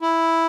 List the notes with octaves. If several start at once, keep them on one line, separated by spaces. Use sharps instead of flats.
E4